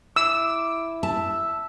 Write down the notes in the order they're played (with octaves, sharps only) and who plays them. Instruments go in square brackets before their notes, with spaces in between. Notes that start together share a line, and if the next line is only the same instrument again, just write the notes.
[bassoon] E4 [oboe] D6 [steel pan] E6
[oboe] E5 [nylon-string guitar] A5